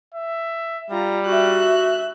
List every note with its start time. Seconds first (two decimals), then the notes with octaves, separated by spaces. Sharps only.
0.14 E5
0.90 G3 F4 A#5
1.27 F#4 E5 F#6